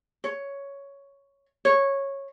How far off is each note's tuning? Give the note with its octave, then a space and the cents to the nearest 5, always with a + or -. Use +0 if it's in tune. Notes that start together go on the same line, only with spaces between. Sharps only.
C#5 +5
C#5 -10